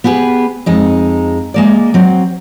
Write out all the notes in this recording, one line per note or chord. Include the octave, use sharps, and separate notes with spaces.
B3 G4 G#4 B4
F2 G#3 D#4
G#3 A#3 D5
F#3 C4